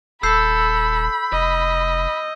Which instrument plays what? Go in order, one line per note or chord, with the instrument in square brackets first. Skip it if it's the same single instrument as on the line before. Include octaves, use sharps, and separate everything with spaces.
[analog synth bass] D#1 [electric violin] A4 [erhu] B5 [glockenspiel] E6 G6 C7
[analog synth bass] F1 [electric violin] D#5